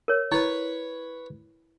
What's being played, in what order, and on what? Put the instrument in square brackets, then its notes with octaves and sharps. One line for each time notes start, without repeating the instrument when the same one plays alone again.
[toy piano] A#4 C#5
[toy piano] E4 [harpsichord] B4 C#5